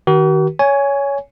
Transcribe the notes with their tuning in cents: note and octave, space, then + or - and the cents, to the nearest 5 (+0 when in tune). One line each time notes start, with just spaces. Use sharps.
D#3 +0 F#4 +45 A#4 +35
C#5 +15 G#5 +0